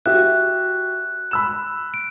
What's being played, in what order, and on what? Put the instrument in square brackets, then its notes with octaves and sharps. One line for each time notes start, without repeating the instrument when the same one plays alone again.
[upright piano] F#4 G4 E5 [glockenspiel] F#6
[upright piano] B5 E6 E7
[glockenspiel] D7